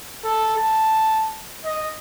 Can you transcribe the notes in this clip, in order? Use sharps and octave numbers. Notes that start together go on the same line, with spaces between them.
A4
A5
D#5